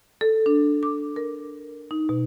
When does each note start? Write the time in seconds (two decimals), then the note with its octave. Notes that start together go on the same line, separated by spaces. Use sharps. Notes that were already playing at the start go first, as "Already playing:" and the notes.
0.21 A4
0.46 D4
0.83 D6
1.16 A#4
1.91 D#4
2.09 B2